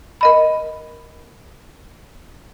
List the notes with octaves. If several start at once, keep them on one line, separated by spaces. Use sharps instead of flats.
A#4 D#5 B5